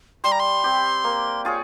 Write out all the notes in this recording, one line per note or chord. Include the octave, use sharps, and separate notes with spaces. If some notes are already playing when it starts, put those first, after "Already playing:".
G3 C6
A#5
C6
C4 G4
A#3
F4 G#4 C#5